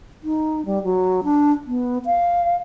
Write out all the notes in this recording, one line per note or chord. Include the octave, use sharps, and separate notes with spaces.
D#4
G3
F#3
D4
B3
F5